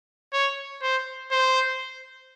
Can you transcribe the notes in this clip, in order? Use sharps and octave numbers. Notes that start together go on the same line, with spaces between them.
C#5
C5
C5